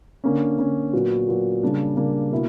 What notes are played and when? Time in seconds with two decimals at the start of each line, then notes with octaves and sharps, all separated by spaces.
0.24 D3 A#3 C#4
0.58 D3 A#3 C#4
0.93 A#2 F#3 B3 F#4
1.28 A#2 F#3 B3 F#4
1.63 C#3 G3 A#3 D4
1.97 C#3 G3 A#3 D4
2.32 B2 A#3 E4